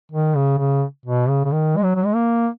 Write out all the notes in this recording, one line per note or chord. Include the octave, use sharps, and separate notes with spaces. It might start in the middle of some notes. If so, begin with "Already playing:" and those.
D#3
C#3
C#3
B2
C#3
C#3
D#3
G#3
F#3
F#3
G#3
A#3